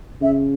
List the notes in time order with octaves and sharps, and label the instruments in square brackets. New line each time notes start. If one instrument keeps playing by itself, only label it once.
[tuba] C#3 [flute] E5